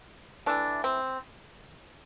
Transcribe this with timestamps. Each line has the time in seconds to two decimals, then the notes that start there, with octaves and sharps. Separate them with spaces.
0.46 E3 A3 D4
0.84 C4